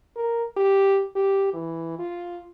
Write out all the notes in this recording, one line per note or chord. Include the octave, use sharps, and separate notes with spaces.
A#4
G4
G4
E3
F4